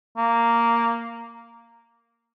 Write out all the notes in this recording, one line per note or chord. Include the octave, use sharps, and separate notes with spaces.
A#3